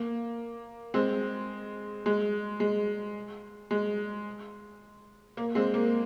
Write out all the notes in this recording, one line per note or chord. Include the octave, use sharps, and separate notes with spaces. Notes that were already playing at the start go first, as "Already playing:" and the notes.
Already playing: A#3
G#3 C4
G#3
G#3
G#3
A#3
G#3 C4
A#3